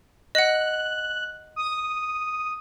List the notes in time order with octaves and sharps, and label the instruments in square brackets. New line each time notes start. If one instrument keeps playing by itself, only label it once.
[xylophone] D#5 F#5 [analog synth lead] F#6
[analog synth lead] D#6